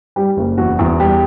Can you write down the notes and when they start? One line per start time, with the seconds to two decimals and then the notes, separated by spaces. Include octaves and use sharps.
0.16 G3 G4
0.37 F#1
0.57 E2 F#4
0.79 E2
1.00 G3 G4